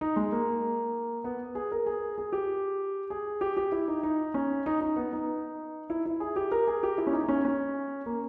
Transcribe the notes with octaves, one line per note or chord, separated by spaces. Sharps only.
D#4
G#3
A#3
B3
G#4
A#4
G#4
G#4
G4
G#4
G4
G4
E4
D#4
D#4
C#4
D#4
D#4
B3
D#4
E4
E4
G#4
G4
A#4
G#4
G4
E4
C#4
D#4
D#4
C#4
C#4
A#3